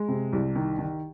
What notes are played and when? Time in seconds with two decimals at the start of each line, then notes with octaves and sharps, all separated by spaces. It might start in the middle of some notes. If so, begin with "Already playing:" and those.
Already playing: G#3
0.08 C3
0.33 C2
0.56 D#3
0.79 D#3